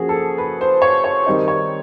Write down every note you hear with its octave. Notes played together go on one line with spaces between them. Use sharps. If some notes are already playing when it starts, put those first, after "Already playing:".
Already playing: F3 A#3 C#4 F#4 G#4
A4
B4
C5
C#5
C#5
D#3 G3 C4 D#4
C#5